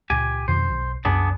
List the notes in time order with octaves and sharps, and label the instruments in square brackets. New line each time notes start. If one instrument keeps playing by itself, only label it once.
[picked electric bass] C#2 A#2 [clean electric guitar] G4 G#5
[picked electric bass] F2 B2 D#3 [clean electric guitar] C5
[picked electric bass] B1
[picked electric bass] C2 F#2 [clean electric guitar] B3 D4 G#4